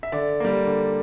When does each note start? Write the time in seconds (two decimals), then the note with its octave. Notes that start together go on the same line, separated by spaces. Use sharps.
0.03 E5
0.12 D3 D5
0.40 G3 A#3
0.67 D3